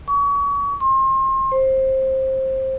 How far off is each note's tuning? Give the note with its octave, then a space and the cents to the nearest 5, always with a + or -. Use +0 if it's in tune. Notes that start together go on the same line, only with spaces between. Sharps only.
C#6 +35
C6 +35
C5 +20